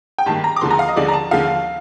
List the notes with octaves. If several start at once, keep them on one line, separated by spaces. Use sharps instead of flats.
G5
G2 D#3 A#3 A5
A#5
D6
D#2 D3 F3 C6
A#5
F5
D#5
D#2 D3 F3 D5
A#5
A5
D#2 D3 F3 F5